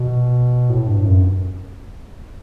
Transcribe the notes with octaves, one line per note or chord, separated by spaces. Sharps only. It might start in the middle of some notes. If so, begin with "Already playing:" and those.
Already playing: B2
A2
G2
F#2